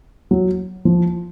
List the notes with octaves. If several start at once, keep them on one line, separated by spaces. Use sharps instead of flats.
F#3
F3